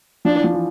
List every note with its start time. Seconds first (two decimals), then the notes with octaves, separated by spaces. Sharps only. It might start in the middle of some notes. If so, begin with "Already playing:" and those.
0.25 F3 D4
0.35 E3
0.44 F3
0.54 E3